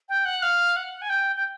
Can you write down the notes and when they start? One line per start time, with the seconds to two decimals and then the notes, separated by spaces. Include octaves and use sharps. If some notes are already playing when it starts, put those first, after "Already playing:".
0.09 G5
0.25 F#5
0.42 F5
0.76 F#5
1.02 G#5
1.10 G5
1.36 G5